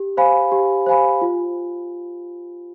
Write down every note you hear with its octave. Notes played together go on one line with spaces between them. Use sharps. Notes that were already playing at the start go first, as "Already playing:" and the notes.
Already playing: G4
C5 F5 G#5 B5
G4
C5 F5 G#5 B5
F4